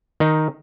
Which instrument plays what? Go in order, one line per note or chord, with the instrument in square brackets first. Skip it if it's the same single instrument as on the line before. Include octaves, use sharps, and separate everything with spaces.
[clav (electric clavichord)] D#3 D#4